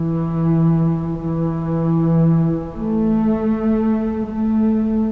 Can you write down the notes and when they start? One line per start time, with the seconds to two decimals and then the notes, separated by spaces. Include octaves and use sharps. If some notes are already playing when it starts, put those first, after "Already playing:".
Already playing: E3
1.25 E3
2.75 A3
4.26 A3